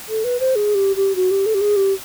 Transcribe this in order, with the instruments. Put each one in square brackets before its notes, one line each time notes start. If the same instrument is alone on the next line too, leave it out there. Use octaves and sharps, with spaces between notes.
[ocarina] A4
B4
C5
G#4
G4
G4
F#4
G4
A4
G4
G#4
G4